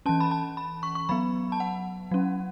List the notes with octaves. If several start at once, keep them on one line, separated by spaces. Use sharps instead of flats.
E3 C#4 A5
B5
A5
B5
C#6
C#6
F#3 B3 B5
A5
F#5
F#3 C#4